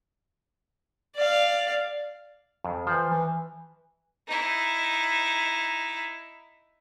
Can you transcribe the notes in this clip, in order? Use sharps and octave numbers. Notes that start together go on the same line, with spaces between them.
D5 F5
F2
E3 F3 C5
E3
D#4 E4